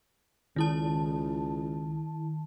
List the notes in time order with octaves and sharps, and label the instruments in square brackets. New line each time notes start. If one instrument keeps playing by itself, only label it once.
[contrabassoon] C#2 [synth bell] D#3 E4 A5